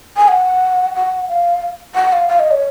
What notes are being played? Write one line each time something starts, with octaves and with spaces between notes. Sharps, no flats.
G#5
F#5
F#5
F5
F#5
F5
F5
D#5
C#5